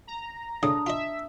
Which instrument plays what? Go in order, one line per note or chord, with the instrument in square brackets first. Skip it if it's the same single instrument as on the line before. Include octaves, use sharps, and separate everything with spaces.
[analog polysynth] A#5
[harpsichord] A2 C#3 [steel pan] D4 [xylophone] D#6
[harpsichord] F4 D#5 [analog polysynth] E5